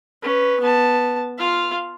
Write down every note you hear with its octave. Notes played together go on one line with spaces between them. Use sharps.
C#4 B4
B3 A5
F4 F5